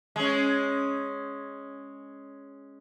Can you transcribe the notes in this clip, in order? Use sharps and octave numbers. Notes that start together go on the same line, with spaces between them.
G#3 C#4